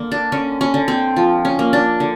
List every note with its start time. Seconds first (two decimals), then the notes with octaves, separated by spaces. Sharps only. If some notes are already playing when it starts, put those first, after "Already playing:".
Already playing: D3 A#3
0.12 D4
0.32 D3 C#4
0.61 C#4
0.74 D3
0.88 C4
1.16 F3
1.45 C#4
1.59 A#3
1.73 D4
2.00 D3